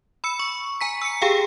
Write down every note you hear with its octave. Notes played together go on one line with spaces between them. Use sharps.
B5 E6 C#7
C#6
G#5 A#5 B6
E6 C#7
G4 G#4 F5 G5